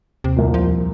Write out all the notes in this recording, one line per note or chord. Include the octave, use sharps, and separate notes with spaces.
D#2 C3
C2 A#2
F3